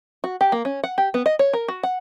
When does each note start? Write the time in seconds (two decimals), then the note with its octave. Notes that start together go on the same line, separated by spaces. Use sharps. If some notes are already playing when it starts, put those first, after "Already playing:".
0.24 F#4
0.41 G4
0.52 A#3
0.65 C#4
0.84 F#5
0.98 G4
1.14 B3
1.26 D#5
1.39 C#5
1.53 A#4
1.68 F#4
1.83 F#5